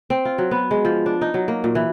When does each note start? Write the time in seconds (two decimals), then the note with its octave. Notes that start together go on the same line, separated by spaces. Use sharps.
0.10 C4
0.25 F4
0.38 F#3
0.51 B3
0.71 G#3
0.85 F3
1.06 D4
1.21 D#4
1.34 F#3
1.48 A#3
1.64 A#2
1.75 E3